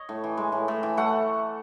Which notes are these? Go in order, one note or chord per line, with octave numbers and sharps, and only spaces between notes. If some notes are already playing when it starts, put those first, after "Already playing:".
Already playing: C#5 D#5
A2
E3
G#3
A2
A2
E3
A3 F#5